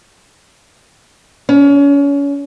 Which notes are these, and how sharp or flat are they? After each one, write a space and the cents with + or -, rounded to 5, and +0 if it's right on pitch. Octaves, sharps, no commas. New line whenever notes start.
C#4 +30